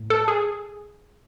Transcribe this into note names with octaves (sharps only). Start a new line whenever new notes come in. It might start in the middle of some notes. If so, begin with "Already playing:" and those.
Already playing: A2
A4
G#4